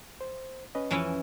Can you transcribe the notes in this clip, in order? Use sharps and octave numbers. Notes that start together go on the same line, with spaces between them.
C5
C#4 B4 D#5
F2 E3 F3 C#4 E4